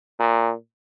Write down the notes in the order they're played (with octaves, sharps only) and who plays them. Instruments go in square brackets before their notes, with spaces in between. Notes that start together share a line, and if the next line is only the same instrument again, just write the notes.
[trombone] A#2